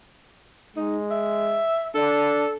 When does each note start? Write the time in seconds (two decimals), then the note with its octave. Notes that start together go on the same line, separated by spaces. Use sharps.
0.76 G#3 D#4
1.11 E5
1.95 D4 A4